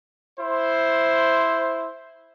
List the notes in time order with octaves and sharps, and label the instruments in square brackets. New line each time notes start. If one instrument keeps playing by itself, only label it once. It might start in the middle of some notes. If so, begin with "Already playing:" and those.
[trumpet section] E4 C5